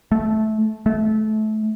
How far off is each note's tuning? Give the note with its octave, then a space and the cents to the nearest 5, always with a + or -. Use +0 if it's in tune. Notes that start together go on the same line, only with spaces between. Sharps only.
A3 -15
A3 -25